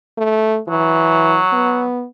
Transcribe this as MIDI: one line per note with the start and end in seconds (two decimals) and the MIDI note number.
0.18 0.59 57
0.68 1.39 52
0.68 1.88 54
1.53 2.05 59